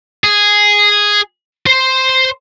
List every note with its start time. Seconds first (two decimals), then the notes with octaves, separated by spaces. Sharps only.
0.24 G#4
1.66 C5 C6